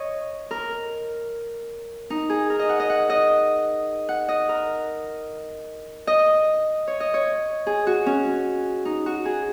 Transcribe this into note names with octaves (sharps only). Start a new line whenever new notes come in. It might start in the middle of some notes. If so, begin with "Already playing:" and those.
Already playing: C#5 D#5
A#4
D#4
G#4
A#4
D#5
F#5
D#5
F#5
D#5
F#5
D#5
A#4
D#5
C#5
D#5
C#5
G#4
F#4
C#4
D#4
F#4
G#4